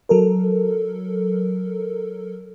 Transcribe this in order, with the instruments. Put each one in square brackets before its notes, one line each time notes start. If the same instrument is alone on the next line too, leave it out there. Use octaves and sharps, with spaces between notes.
[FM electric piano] F#3 A4 A#4